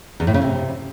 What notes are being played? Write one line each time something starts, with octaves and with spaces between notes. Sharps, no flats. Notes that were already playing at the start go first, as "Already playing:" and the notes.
E2
A2
C#3
C3